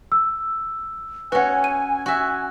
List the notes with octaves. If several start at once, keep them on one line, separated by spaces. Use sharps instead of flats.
E6
C#4 F#4 B4 F#5 G#5
D#7
F#4 E5